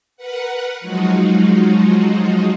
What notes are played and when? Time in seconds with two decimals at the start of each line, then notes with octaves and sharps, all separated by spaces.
0.16 A#4 B4 F#5
0.80 F3 F#3 G#3 D#4 F4 F#4